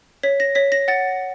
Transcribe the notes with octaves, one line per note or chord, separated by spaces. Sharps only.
C#5 B6
A#6
C#5 B6
A#6
F#5 A6